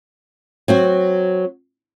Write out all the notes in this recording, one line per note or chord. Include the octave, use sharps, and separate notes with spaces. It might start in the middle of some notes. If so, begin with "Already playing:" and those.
F#3 C4 F#4